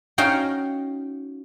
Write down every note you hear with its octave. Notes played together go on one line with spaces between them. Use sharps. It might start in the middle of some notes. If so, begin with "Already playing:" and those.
C#4 D#4 F#4 F5 G5